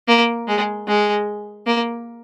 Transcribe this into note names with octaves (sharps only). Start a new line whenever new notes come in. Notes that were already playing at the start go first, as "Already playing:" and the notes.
A#3
G#3
G#3
A#3